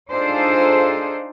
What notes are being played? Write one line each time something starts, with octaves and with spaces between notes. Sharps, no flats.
D4 D#4 F4 G#4 A4 C5